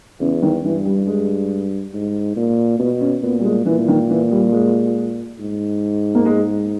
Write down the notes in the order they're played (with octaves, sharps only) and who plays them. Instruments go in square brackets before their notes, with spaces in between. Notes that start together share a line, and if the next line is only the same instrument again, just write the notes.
[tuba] E2 [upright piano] C#3
[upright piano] D#3
[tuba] G2 [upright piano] E3
[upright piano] G3
G#3
[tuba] G#2
A#2
[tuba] B2 [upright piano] B3
[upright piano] C#4
[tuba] A#2 [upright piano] B3
[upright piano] G3
G#3
[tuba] A#2 [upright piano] E3
[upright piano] E3
D#3
E3
G3
G#3
[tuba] G#2
[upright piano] A#3
G#3